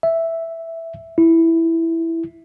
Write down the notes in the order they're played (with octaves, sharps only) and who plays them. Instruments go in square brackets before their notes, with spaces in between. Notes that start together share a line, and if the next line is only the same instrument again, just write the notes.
[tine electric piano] E5
E4